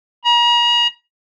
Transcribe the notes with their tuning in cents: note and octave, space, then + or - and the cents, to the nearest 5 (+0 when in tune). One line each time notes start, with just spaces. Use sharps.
A#5 +40